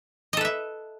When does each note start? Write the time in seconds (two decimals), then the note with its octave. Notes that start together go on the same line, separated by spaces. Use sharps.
0.33 D#5
0.37 A4
0.41 B4
0.45 E5